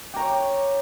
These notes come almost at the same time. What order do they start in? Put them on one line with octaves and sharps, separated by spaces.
G4 A#5 C#6 C#5